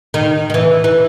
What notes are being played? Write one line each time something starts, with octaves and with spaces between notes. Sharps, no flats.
D#3
D#3
E3
E3